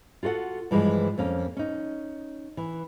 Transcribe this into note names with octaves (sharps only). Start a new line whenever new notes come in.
F4 F#4 A4 F#5
G2 E3 F3 G#3
F2 A#3 C#4
C#4 D#4
E3